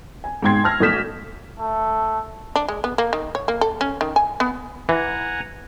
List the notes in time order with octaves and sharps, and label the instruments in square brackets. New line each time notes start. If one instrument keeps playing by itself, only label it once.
[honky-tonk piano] G#5
G#2 B2 G5 C6 G#6 C7
A5 E6 F6 A#6
B1 A3 D#6 G6 B6 E7
[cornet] A3
[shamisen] D4
G#3
B3
A#3
D#3
C#5
A#3
A4
C#4
D#3
G#5
B3
[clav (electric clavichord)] E3 [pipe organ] F#5 G#5 A#5